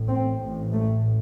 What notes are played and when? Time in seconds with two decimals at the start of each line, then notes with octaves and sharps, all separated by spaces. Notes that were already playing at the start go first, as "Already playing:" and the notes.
Already playing: A1 A2
0.08 C4
0.40 A1 A2
0.73 A3